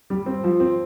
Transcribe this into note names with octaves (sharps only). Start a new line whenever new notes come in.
G3
C4
F3
C4